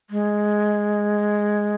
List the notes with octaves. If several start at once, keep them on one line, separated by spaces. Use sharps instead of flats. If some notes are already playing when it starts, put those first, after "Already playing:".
G#3